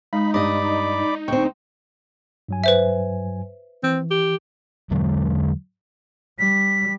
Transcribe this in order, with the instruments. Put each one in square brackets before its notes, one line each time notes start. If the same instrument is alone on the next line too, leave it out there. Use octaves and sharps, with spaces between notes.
[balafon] G#3 [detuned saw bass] D#4 [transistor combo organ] B5
[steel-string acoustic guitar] G2 D#5 [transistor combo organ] D5 B5 D6
[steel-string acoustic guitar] D2 C4 [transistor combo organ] G5 C#6
[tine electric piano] G2 F#3 G#5
[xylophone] B4 C5 E5
[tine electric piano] E3 [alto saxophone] C4
[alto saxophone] G4
[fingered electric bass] E2 D3 F#3 G#3
[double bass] G3 [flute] B6